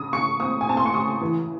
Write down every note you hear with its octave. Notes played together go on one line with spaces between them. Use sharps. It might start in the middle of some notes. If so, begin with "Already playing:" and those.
Already playing: C#3 D#6
C#3 C#6
C4 D#6
G#5
C4 A5
C6
C#6
C#3 D#6
E3